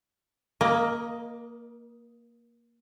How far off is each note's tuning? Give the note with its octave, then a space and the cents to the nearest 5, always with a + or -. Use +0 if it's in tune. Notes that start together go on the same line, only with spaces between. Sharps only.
A#3 +0 A#4 +35 D#5 +0